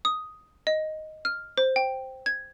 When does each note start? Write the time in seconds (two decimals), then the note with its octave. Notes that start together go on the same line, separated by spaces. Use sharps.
0.05 D#6
0.67 D#5
1.25 F6
1.58 C5
1.76 G5
2.26 G#6